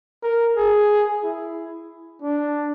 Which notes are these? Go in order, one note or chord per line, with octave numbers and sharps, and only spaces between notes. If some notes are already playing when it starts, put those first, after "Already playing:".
A#4
G#4
E4
D4